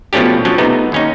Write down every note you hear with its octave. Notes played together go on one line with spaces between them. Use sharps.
B2 F3 A3 C#4 D4 G4
F3 F#3 C#4 D4
C3 A3 B3 D#4
D#2 C#4 D#4